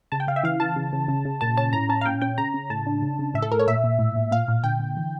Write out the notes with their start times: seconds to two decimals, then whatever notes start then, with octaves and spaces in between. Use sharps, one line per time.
0.12 C#3 A5
0.20 G5
0.28 C#3 F5
0.36 E5
0.44 E3 F5
0.60 E3 A5
0.76 C#3
0.93 C#3
1.08 C#3
1.25 C#3
1.41 A#2 A5
1.57 C#4 A5
1.73 A2 A#5
1.89 C#4 A5
2.01 F5
2.05 A#2 G5
2.21 C#4 G5
2.38 C#3 A#5
2.54 C#3
2.70 A2 A5
2.87 D4
3.02 C#3
3.19 C#3
3.34 A2 E5
3.42 A4
3.51 A2 A#4
3.59 C#5
3.67 A#2 E5
3.84 A#2
3.99 A2
4.16 A2
4.31 A#2 F5
4.48 A#2
4.64 D3 G5
4.80 D3
4.97 E3